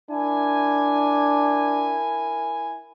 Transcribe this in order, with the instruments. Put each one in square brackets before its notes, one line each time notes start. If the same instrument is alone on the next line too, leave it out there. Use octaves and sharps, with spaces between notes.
[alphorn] D4 [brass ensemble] E4 A#4 G#5